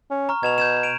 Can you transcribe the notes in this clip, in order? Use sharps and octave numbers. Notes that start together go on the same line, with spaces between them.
C#4
A#5 C#6 F6
B2 G#6 E7 F7
G6 G#6 E7
D7 D#7 F7